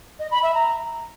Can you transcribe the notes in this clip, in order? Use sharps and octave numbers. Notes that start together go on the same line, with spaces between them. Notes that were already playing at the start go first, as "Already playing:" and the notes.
D#5
B5
E5
A#5